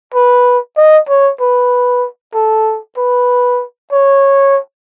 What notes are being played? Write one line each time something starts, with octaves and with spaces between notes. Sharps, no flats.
B4
D#5
C#5
B4
A4
B4
C#5